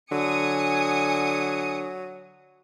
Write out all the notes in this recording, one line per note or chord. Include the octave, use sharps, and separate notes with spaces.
D3 F#3 G#5 D#6 C#7